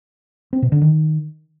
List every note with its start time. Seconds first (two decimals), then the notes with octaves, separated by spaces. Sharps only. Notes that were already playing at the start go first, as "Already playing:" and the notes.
0.53 C4
0.62 B2
0.72 D3
0.81 D#3